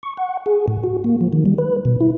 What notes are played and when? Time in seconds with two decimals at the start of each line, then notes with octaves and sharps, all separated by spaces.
0.03 C#6
0.17 F#5
0.46 G#4
0.68 A2
0.84 F#4
1.04 A#3
1.21 F3
1.33 D#3
1.46 G3
1.58 B4
1.85 B2
2.01 E4